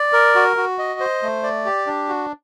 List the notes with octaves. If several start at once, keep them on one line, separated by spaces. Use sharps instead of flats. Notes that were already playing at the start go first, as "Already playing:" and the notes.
Already playing: D5
A#4
F#4
F#4
D#5
C5
A3
D5
G4
D4
F#4